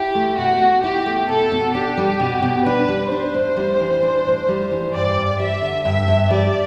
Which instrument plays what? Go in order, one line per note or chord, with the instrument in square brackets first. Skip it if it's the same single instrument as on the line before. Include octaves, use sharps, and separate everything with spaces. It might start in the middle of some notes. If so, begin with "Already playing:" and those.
Already playing: [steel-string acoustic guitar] E4 [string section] G4
[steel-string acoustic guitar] A3
[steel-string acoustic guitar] B2 [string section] F#4
[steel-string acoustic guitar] B2
[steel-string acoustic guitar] E4 [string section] G4
[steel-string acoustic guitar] A3
[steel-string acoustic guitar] B2 [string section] A4
[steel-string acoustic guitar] B2
[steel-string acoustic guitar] D4 [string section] G4
[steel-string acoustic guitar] G3
B2
B2
[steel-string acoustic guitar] D4 [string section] B4
[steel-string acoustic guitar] G3
[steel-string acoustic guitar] D4 [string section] C5
[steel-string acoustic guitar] A2
G3
E3
D4
A2
G3
E3
[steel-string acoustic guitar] G2 [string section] D5
[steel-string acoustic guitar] G2
[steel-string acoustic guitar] G3 [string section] E5
[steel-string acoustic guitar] D3
[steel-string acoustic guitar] G2 [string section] E5
[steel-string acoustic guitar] G2
[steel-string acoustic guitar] G3 [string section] D5